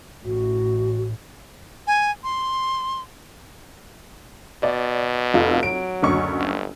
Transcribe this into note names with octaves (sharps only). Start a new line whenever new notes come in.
A1 A2 F#4
G#5
C6
B2 D5
F1 F4 A4
F#3 D7
F#1 D2 C#6
G1